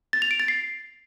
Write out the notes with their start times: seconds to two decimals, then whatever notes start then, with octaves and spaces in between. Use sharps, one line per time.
0.13 A6
0.22 F7
0.31 D7
0.40 A6
0.48 C7